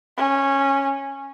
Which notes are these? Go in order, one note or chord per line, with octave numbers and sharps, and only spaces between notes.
C#4